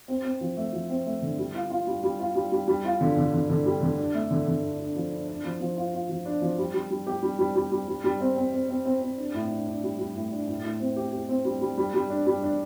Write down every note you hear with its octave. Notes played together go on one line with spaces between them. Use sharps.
C4
C4
F3
A3
F3
C4
A3
D3
G3
F4
F4
G3
G3
F4
G3
G3
G3
F4
D3
D3
D3
D3
G3
D3
D4
A3
D3
D3
D4
D4
F3
D4
D4
F3
F3
F4
F4
F3
D4
F3
G3
G3
G3
G4
G3
G3
G3
G3
G3
G3
C4
C4
C4
C4
C4
C4
D4
A2
D4
D4
G3
G3
A2
D4
A2
A2
C4
G4
G4
C4
G3
G3
G3
G3
D4
G3
D4